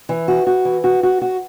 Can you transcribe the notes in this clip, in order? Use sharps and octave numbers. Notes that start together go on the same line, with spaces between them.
E3
F#4
F#4
E3
F#4
F#4
F#4